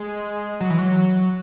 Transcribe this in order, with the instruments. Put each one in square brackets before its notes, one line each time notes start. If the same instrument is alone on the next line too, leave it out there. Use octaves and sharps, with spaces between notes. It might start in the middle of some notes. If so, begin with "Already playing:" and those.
Already playing: [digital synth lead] G#3
F#3
E3
F#3